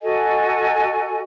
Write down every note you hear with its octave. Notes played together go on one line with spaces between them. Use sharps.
F#4 A4 D#5 G#5